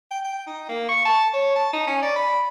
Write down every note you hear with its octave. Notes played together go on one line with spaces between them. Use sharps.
G5
G5
D#4
A#3
C#6
A5
C#5
A5
D#4
C#4
D5
B5